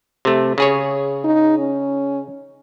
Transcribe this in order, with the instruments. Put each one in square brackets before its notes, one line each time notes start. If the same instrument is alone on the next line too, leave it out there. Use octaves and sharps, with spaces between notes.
[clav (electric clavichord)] C3 A3
C#3 G#4 C#5
[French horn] D#4
C#4